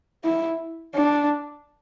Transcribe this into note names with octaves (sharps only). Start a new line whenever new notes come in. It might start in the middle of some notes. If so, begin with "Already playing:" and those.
E4
D4